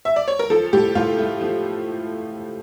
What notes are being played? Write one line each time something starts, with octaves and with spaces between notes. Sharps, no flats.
E5
D5
C#5
A#4
F3 A4
A2 G4
A2 F4
A3
F3